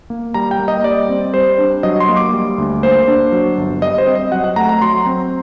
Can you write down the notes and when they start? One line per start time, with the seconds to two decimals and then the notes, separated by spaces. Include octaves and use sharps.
0.10 A#3
0.34 G3 A#5
0.51 G5
0.59 A#3
0.68 D#5
0.84 G3 D5
1.09 C4
1.34 G3 C5
1.58 D4
1.83 F#3 D#5
2.00 C6
2.08 A#3
2.17 D6
2.33 G3
2.58 D2
2.83 A#3 C5
3.08 D4
3.32 F#3
3.57 G1
3.82 G3 D#5
3.98 C5
4.07 C4
4.15 D#5
4.32 F#3 F#5
4.44 F#5
4.56 A3 A#5
4.69 A#5
4.82 F#3 C6
5.06 C4